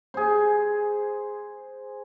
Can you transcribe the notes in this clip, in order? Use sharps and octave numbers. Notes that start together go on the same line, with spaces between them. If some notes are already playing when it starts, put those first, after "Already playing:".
G#4 C5